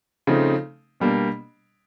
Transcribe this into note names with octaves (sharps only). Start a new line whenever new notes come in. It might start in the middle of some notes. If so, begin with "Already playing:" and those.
C#3 F3 A3 C4 D#4
B2 G3 A#3 D4